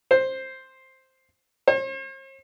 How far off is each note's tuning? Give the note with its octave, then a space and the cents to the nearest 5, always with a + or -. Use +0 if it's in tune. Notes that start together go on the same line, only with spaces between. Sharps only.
C5 +5
C5 +45